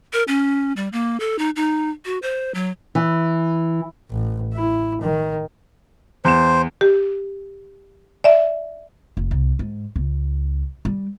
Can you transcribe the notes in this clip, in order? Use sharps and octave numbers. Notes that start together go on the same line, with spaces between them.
A#4
C#4
G3
A#3
A4
D#4
D#4
F#4
C5
F#3
E3
A1
E4
D#3
E2 C5 E7
G4
D5 E5
F1
C2
G#2
C#2
G3